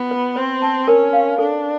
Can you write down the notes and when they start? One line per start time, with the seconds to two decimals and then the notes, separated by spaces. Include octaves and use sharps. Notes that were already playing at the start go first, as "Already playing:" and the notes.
Already playing: B3 F4
0.11 B4
0.36 C4 C5
0.62 A5
0.88 C#4 A#4
1.13 F5
1.38 D4 A4